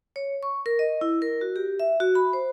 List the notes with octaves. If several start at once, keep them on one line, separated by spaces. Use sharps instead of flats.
C#5
C#6
A#4
D#5
E4
A#4
F#4
G4
E5
F#4
B5
C5